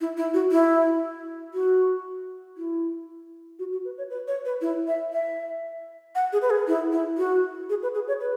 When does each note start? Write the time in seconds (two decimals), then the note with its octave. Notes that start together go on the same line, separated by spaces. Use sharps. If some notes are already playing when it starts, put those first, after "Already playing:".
0.01 E4
0.17 E4
0.34 F#4
0.52 E4
1.54 F#4
2.57 E4
3.59 F#4
3.72 F#4
3.85 B4
3.98 C#5
4.10 B4
4.28 C#5
4.45 B4
4.61 E4
4.87 E5
5.13 E5
6.15 F#5
6.33 G#4
6.42 B4
6.50 G#4
6.67 E4
6.92 E4
7.18 F#4
7.70 G#4
7.83 B4
7.95 G#4
8.08 C#5
8.21 B4